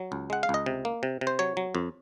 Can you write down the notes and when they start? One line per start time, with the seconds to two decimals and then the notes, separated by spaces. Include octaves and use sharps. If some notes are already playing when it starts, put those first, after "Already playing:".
Already playing: F#3
0.12 C#2
0.30 G#3 F#5
0.43 F5
0.49 C#2 D#5
0.66 C3
0.85 A#3
1.03 C3
1.21 C3
1.27 C5
1.39 F#3 C#5
1.57 F#3
1.75 F2